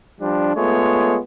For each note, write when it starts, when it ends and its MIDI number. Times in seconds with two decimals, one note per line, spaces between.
0.21 0.54 53
0.21 0.54 55
0.21 0.54 62
0.56 1.18 56
0.56 1.18 57
0.56 1.18 59
0.56 1.18 65
0.56 1.18 73